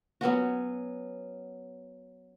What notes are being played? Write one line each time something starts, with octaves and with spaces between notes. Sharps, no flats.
F#3 B3 C#4 F#4